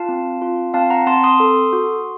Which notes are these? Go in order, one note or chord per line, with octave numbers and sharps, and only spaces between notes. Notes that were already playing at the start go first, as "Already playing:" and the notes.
Already playing: F4 F5 A5
C4
F4
C4 F5 A5
F#5 A#5
C4 A5 C6
C6 D#6
A4
F#4